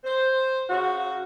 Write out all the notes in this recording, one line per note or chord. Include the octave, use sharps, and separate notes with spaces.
C5
C#3 F#4